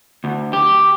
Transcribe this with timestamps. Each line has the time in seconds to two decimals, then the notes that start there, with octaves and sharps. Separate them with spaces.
0.24 D2
0.53 G4